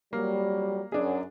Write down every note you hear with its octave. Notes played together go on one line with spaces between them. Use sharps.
F2 F#3 G3 A#3
F#2 D4 G#4